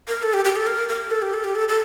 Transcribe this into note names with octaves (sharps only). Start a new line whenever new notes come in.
A#4
A4
G4
G4
A4
A#4
A#4
A4
G4
A4
G4
A4
A4